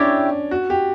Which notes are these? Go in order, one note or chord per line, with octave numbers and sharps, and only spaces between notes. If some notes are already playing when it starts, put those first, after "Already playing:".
Already playing: C#4 D4 E4 G4 C#5
F#4
G4